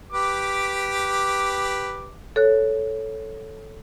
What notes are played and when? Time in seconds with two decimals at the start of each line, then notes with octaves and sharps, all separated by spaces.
0.12 G4 B4 D6
2.36 A4 C#5 F#6